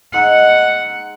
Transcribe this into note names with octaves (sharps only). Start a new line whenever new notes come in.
G#3 D#4 F#5 E6